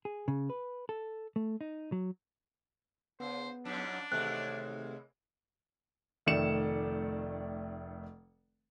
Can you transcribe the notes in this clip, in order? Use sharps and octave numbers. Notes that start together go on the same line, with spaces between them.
G#4
C#3
B4
A4
A3
D#4
F#3
C#3 B3 C5
F2 G#2 C#4 D4
D#2 C3 E3 G#3 A3 C4 F#6
F1 D#3 A3 D5 C#7 E7